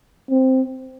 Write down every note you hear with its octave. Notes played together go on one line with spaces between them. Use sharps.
C4